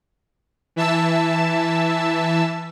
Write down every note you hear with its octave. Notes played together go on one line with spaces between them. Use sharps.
E3 E5 A5 E6